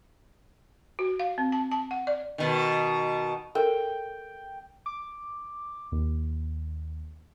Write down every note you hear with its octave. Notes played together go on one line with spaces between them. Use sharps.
F#4
F5
C4
A5
A5
F#5
D5
B2 D#3
A4 A#4 G5
D6
D#2